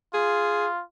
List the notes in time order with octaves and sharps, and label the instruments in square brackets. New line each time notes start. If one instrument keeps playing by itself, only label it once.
[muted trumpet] F4 [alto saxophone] G#4